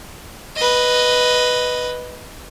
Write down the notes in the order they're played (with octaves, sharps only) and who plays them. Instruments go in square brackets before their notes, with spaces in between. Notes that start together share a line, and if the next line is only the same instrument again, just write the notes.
[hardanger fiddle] B4 D#5